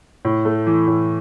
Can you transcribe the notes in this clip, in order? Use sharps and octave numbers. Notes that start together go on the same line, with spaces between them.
A2
A3
E3
A2